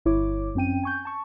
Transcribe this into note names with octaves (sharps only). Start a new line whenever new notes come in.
G1 E4 C#5 D6
F#2 C4 C#4 G5 D#7
G#5 C#6 G6
A5 C#6